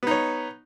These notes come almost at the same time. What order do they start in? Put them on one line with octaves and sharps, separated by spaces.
B3 D#4 C#5